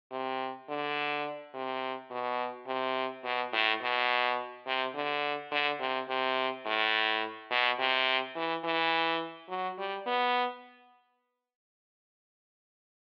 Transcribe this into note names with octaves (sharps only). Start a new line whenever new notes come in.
C3
D3
C3
B2
C3
B2
A2
B2
C3
D3
D3
C3
C3
A2
B2
C3
E3
E3
F#3
G3
B3